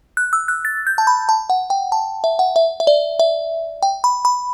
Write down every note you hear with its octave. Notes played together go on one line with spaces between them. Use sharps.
F#6
E6
F#6
A6
G6
A5
B5
A5
F#5
G5
A5
E5
F#5
E5
E5
D5
E5
G5
B5
B5